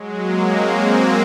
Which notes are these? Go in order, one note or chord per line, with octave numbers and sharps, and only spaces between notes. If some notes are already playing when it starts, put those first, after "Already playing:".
Already playing: F#3 G#3
G#3 A#3
A#3 C4
G#3 A#3